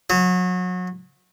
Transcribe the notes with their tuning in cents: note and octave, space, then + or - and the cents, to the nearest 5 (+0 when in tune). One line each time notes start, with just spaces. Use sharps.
F#3 -30